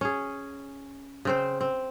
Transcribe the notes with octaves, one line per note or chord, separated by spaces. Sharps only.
C#4 G#4
C#3 C4 C5
C4